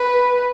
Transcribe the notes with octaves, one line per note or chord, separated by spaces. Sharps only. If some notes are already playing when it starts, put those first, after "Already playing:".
Already playing: B4